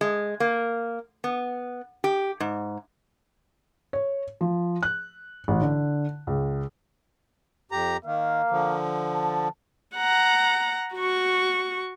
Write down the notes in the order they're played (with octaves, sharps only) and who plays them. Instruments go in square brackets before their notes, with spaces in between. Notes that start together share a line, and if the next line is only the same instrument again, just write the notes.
[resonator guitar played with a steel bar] G#3
A#3
B3
G4
G#2
[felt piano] C#5
F3
F#6
A1
D3
C#2
[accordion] F2 G4 A#5
[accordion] D#3 [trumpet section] A#3 F5
[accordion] D3 F3
[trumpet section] A5
[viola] F#5 A#5
F#4 C#6